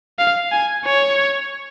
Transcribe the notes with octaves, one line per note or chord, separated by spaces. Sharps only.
F5
G#5
C#5